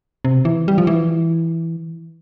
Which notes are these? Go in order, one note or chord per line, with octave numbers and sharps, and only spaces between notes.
C3
E3
G3
F3
E3